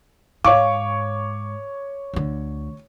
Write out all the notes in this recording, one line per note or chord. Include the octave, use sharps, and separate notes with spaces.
G#2 C#5 F5 C#6 D6
D2 D3